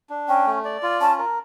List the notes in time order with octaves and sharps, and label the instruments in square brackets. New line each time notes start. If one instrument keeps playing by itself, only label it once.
[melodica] D4
[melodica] C#4 [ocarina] G5
[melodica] A3
D5
F4
[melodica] C#4 [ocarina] A5
[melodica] A#4